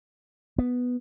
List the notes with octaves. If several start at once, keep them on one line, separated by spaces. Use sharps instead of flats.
B3